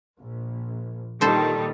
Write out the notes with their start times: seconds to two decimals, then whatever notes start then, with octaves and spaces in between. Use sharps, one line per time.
0.18 A#1
1.21 A#2 D#3 G3 A4 C5